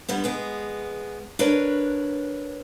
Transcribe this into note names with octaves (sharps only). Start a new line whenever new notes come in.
D3 G3 B3
G#3 B3 G#4
D4 A#4 B4 C#5